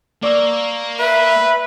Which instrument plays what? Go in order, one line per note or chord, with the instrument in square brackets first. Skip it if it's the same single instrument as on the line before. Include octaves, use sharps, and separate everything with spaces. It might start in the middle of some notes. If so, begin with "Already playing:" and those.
[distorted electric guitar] A#3 [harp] D5 C#6 E6
[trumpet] B4 [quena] E5